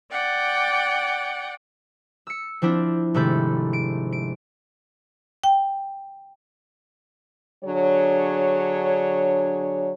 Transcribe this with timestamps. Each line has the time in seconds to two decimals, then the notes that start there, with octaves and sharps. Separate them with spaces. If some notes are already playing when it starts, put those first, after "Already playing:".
0.10 D5 F#5 G5
2.27 E6 C#7
2.62 F3 C4 D4 E4
3.14 G#1 C3 A3 A4 B5 G6
3.73 D7
4.13 D7
5.44 G5
7.64 D3 F#3 D4 G#4 C#5